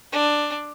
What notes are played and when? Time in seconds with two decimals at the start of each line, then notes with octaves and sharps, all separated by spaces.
0.13 D4